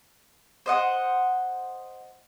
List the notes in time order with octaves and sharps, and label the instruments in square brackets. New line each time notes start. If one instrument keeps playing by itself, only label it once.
[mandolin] C5 D#5 F#5